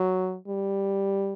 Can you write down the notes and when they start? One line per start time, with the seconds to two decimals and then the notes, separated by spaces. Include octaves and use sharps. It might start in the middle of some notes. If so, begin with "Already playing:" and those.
Already playing: F#3
0.48 G3